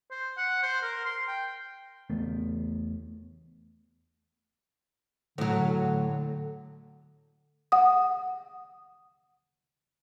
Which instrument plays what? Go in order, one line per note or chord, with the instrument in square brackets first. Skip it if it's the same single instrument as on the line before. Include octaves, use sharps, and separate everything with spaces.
[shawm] C5
F#5
C5
A#4
C6
G5
[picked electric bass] E2 A3 B3
[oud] A2 F#3 [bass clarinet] D3
[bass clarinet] D3
[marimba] F#5 D#6